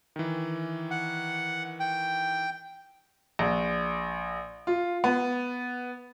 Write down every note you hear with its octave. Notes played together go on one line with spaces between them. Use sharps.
D#3 E3
F#5
G5
A#1
F4
B3